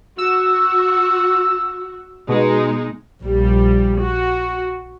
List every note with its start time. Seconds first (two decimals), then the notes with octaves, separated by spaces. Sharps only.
0.18 F#4 E6
2.28 B2 G#3 D#4
3.22 A#1 G3
4.01 F#4